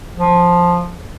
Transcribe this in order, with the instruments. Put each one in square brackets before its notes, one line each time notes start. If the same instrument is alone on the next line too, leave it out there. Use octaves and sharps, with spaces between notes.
[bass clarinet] F3